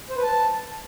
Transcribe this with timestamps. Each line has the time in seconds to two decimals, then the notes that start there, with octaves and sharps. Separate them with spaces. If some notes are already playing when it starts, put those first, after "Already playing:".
0.10 C5
0.17 B4
0.23 A5